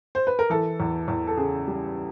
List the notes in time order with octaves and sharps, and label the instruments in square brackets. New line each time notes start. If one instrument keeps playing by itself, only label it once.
[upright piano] C5
B4
A#4
E3 A4
E2
E2
A4
C#3 G#4
G3